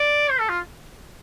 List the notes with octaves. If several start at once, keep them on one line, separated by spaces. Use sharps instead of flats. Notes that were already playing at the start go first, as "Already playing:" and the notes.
Already playing: D5
C5
A4
F4